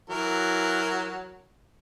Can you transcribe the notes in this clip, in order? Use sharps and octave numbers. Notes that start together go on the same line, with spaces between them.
E3 F#3 A#4